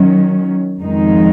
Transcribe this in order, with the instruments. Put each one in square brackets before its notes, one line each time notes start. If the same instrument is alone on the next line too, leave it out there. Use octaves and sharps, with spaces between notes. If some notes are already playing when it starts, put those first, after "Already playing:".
Already playing: [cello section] D#3 F#3 C#4
F2 D#3 G#3 D#4